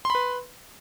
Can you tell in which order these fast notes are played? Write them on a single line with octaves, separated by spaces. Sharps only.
C6 B5 B4